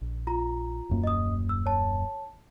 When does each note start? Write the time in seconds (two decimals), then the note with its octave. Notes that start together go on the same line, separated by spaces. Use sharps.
0.01 A#1
0.27 F4 A#5
0.89 D#1 F#2 A#3
1.04 D#5 D#6
1.49 E6
1.66 C#5 A5